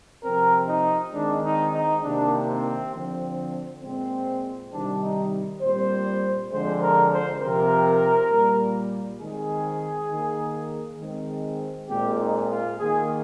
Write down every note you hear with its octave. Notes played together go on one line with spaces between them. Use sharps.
C3 F3 C4 A#4
D#4
D#3 G#3 C4 D4
D#4
D#4
C3 D#3 A#3 D4
C4
D3 F3 C4
A#2 G#3 C4
C3 D#3 G3 D4
D#4
A#2 G3 C4 C5
D3 F3 G#3 C4 C5
A#4
C5
C3 F3 C4 A#4
A#2 G3 A#3
D#3 G#3 C4 G#4
D#3 A#3
D#3 G#3 C4
A#2 G#3 C4 G4
D#4
F4
D#3 A#3 G#4